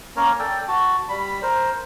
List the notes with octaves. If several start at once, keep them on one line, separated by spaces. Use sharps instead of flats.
A#3 C#4 A#4 C#5
A4 D5 G5
F#4 A5
G3 B5
A#4 C5